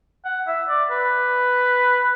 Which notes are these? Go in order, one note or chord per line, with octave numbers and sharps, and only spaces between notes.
F#5
E5
D5
B4